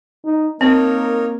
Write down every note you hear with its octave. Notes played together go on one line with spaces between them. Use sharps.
D#4
A#3 C4 D#4 A#4 C#5